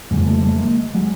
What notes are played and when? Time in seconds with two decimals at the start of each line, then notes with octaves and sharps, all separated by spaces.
0.11 F2 C#3 F#3 G#3
0.27 G3 A3
0.42 G3 A3
0.58 G#3 A#3
0.95 F#3 G#3